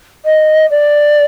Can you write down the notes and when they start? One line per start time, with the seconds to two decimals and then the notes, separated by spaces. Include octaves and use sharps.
0.25 D#5
0.70 D5